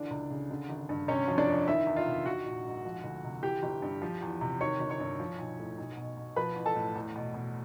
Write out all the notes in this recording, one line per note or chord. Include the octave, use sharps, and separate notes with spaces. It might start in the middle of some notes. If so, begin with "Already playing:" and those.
Already playing: D3 E3 D4 D5
C#2
C#3
D3
G#1
G2
C3 C#4 C#5
F3
D4 D5
F2
D#3 E4 E5
E2
F4 F5
C3
D#3 F#4 F#5
A#1
G#2
F3
D2
C3
E3 G4 G5
G1
G2
F3
E2
C3
D#3 C#5 C#6
G1
C#5 C#6
G2
F3
B1
A2
B1
B2
B2
F3 B4 B5
A1
A4 A5
A2
E2
B2
B2